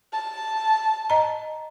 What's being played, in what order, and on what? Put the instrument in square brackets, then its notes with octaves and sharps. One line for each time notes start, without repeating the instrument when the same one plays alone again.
[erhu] A5
[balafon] D#5 A#5